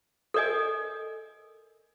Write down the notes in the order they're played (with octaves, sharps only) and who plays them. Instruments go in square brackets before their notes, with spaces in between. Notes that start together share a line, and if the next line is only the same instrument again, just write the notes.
[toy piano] A4 A#4 D5 D#5 G#5